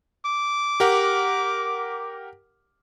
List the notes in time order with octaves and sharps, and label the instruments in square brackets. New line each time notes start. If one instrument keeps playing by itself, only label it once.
[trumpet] D6
[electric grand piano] G4 A#4 F#5